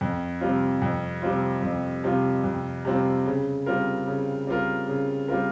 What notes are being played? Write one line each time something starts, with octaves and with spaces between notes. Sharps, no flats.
F2
C3 G3 C4 F4
F2
C3 G3 C4 F4
F2
C3 G3 C4 F4
F2
C3 G3 C4 F4
C#3
G3 C4 F4 A#4
C#3
G3 C4 F4 A#4
C#3
G3 C4 F4 A#4